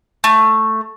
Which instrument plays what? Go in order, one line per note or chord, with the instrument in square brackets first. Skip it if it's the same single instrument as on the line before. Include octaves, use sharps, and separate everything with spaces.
[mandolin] A3